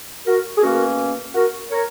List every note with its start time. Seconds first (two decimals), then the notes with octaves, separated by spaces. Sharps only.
0.27 F#4 A#4
0.58 G#4
0.63 B2 A#3 C#4 F#4 A#4
1.35 F#4 A#4
1.71 A#4 C#5